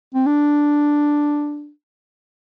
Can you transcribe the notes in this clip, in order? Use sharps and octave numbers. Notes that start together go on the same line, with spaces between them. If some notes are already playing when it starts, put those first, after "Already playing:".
C4
D4